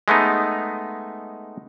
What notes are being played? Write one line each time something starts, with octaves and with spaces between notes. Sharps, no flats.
G#3 A3 B3 D#4